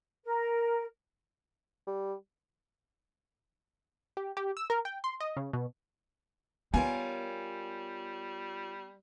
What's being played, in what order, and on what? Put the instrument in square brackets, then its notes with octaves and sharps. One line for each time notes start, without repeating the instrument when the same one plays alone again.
[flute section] A#4
[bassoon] G3
[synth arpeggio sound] G4
G4
E6
A#4
G5
C6
D#5
C#3
B2
[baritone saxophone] G3 [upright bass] B3 [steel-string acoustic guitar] F4 A#4 C#5 [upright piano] G#5